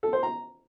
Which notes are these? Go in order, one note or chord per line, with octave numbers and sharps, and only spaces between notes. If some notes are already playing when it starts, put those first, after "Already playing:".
A4
C5
A#5